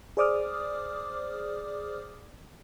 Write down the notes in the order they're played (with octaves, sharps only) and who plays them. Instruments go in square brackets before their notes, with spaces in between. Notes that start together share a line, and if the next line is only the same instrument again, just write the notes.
[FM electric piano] G#4 C5 D5 D6 D#6 F6